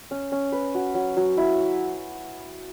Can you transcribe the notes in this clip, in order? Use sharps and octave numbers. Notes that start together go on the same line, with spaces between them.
C#4
C#4
B4
F#4
F#3
F#3
E4